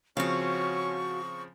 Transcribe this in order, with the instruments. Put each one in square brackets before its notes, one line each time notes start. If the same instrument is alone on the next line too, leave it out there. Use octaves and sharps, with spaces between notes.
[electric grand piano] C#3 F3 C4 [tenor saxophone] C#4 [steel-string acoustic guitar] F#4 F5 [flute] C#6